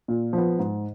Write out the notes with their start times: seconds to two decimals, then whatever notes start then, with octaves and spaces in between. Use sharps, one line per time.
0.08 A#2
0.33 F3 B3
0.59 G#2